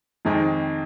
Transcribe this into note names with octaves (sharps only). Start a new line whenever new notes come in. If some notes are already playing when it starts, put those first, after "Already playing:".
F2 D#3 G#3 C4 D#4